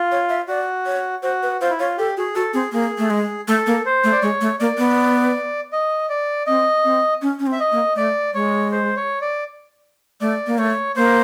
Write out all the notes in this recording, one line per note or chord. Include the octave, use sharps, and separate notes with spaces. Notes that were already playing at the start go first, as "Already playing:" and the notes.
Already playing: F4
C#5
E5
F#4 D5
C#5
F#4 C5
B4
F4 C5
E4
F4 C#5
G4 A4
F#4 G#4
F#4 A4
C4 G#4
A#3 G#4
A3
G#3
A3 A4
A#3
C5
A3
D5
G#3 C#5
A3
A#3 D5
B3
D#5
D5
C4 D#5
C4
C#4
C#4
C4
E5
D#5
A#3
A3 D5
G#3 C#5
C5
C#5
D5
A3 D5
A#3
A3 C#5
A#3 C5